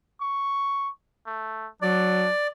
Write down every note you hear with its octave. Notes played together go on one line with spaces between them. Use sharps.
C#6
A3
F#3 D4 D5